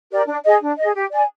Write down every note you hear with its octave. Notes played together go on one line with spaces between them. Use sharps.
G4 A#4 D5
D4
G#4 D#5
D4
G#4 D#5
G4
D5 G#5